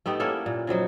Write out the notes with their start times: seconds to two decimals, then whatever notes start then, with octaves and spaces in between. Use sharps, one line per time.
0.06 A3 B3 D#4 G4
0.20 A#3 C#4 E4 A4
0.46 A#2
0.67 C#3 F3 F#3 D#4